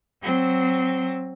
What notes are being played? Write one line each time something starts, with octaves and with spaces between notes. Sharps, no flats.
F#3 C4